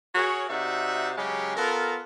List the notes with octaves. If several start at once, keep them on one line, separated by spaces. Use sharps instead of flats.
F#4 G#4 A#4 C#5
C3 D#4 F#4 D5 E5
C#3 F#3 G#3 C#4 G4
B3 F4 A4 A#4